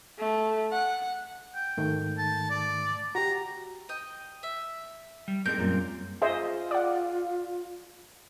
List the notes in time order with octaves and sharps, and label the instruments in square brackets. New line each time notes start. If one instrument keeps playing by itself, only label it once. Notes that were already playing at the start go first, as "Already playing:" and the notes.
[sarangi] A3
F#5
[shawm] G5
[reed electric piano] G#2 D#3 A3
[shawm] A5
D5
[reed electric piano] F#4 G4 [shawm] A#5
[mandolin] D#5 G5
E5
[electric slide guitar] G3
[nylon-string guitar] A2 G#3 D#4 [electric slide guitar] G3 C4 A#4 [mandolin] G6
[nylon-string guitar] F#2 A#2 A#3
[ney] F4 [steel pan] G#4 C5 D#5 [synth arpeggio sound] E5
[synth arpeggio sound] D5 F#5